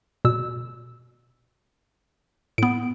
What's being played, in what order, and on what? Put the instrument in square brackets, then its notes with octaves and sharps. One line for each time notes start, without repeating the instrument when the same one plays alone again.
[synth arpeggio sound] B2 E6
[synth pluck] A2 B3 [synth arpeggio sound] D7